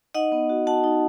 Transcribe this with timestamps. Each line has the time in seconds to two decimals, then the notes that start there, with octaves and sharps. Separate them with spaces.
0.14 D#4 D#5 F#5
0.32 B3
0.50 F#4
0.67 F#4 F#5 A5
0.84 D#4